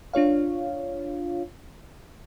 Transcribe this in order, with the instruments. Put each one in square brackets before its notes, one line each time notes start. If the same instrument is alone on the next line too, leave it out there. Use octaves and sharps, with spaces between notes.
[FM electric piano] D4 F4 C#5 F5